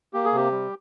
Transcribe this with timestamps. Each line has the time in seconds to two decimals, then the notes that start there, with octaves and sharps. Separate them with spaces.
0.13 A#3 G4
0.25 G#4
0.33 C3 G4
0.52 G3